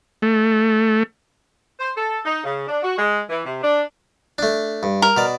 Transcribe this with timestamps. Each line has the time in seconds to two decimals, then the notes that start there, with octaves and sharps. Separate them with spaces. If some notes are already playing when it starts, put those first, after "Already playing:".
0.22 A3
1.80 C5
1.97 A4
2.25 D#4
2.44 C#3
2.68 D4
2.82 F#4
2.98 G#3
3.29 E3
3.45 C3
3.63 D4
4.38 A3 D4
4.83 G2
5.02 A#4
5.17 B2 D5